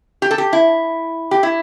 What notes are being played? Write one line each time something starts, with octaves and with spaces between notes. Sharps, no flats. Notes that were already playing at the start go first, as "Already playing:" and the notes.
G4
A4
G4
E4
G4
E4